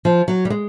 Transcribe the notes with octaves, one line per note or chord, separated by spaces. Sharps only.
F3
F#3
G3
G#3